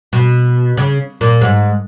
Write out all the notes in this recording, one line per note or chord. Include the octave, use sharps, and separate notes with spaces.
B2
C#3
A#2
G#2